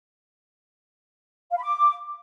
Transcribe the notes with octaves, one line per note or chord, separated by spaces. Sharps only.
F5
B5
D6